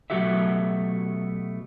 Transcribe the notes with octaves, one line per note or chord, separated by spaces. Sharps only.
B2 F#3 A3 F#4 G4 E5